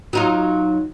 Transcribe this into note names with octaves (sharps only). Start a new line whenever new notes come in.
F#3 D#4 F4